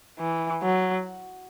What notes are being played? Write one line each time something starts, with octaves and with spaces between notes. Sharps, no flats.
E3
F#3